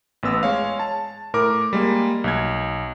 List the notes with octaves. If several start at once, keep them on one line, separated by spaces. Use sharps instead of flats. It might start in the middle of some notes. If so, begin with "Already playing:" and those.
A1 B3 E6
G#3 C#5 F5
A5
A2 A#4 D6
G3 G#3 A#3
B1 G#6